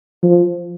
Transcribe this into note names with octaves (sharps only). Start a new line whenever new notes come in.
F3